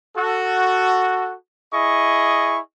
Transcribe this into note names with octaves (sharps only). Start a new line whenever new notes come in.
F#4 A4
E4 G#4 D#5 C#6